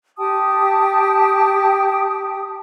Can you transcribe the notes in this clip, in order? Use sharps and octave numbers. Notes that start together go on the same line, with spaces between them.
G4 G5 A5 D#6